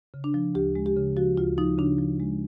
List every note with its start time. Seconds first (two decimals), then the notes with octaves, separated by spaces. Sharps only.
0.14 C#3
0.24 D4
0.34 F3
0.55 D2 G4
0.75 G#3
0.86 G4
0.96 C#3
1.17 F3 F#4
1.37 D2 F4
1.58 F3 D#4
1.78 C#3 D4
1.99 F3
2.20 G#3